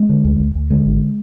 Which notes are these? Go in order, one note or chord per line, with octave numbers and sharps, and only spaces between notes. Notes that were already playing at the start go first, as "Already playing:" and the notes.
Already playing: G#3
D3
D2
D2
D2
D3 G#3
G#1